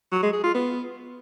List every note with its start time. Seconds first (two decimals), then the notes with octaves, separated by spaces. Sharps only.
0.12 F#3
0.23 G#3
0.33 G#4
0.44 F4
0.54 B3